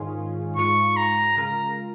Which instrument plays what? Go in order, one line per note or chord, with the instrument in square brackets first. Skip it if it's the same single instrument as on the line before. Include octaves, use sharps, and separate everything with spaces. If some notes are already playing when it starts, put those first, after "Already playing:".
Already playing: [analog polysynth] G#2 D#3 C#4 F4 G#4
[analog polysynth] G#2 G#3 F4 [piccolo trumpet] C#6
[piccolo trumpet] A#5
[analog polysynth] C#3 G#3 F4 A#4 [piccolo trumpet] A#5